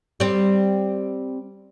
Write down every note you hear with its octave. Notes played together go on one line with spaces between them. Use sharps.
G3 C4